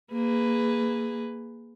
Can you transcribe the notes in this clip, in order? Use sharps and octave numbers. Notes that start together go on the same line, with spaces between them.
A#3 G#4 B4